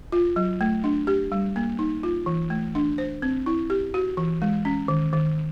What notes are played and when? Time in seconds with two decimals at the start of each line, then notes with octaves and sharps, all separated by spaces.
0.12 F4
0.36 F#3
0.61 A3
0.84 D4
1.07 G4
1.32 G3
1.56 A#3
1.79 D#4
2.03 F4
2.26 E3
2.50 A3
2.75 D4
2.98 C5
3.22 C4
3.46 E4
3.70 G4
3.94 F#4
4.17 E3
4.42 G#3
4.65 C#4
4.88 D#3
5.13 D#3